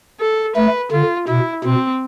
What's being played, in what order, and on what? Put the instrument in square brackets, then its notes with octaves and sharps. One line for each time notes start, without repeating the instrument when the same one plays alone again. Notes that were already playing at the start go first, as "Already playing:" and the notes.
[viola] A4
[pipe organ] A3 [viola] B4
[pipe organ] D3 [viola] F4
[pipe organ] B2 [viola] E4
[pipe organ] B2 [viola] C4